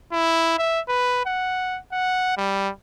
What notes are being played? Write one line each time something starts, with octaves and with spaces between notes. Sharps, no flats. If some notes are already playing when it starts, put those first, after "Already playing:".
E4
E5
B4
F#5
F#5
G3